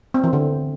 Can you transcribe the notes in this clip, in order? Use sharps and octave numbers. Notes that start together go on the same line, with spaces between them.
C4
E3
D3